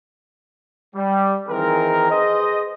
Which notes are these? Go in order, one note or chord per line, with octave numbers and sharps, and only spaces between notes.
G3
D#3 E3 C4 D#4 G#4 A#4
G#4 B4 C5 D#5